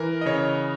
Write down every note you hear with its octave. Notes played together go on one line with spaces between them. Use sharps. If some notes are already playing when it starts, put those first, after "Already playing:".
Already playing: E3 A#4
D#5
C#3 C#5